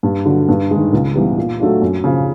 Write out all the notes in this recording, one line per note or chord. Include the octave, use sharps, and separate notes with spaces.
G2
D3 F#3
G2
D#3 G#3
C#2
C#3 E3 G3 B3
A#2
F#3 A3 D4 F4
F#2
C#3 F3